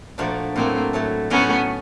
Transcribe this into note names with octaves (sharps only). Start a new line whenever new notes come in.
A#2 F3 A3 D4 F#4
A2 F#3 A3 A#3 C4
A2 F#3 A3
A2 F#3 A3 B3 C#4